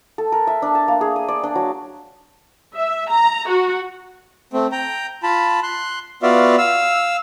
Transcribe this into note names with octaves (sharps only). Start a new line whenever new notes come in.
A4
A#4
E5
D4
A5
A#3
G#4
D#6
D5
D4
F#3
E5
A#5
F#4
A3 C4
G5 A#5
F4 A5 B5
C6 F#6
B3 F4 F#4 D5 E5 F5
F5 E6